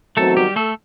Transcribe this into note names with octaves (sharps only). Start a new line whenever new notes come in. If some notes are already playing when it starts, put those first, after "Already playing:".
E2 D#3 F#3 A3 C4 F#4 A4
G3 G4
A3 A4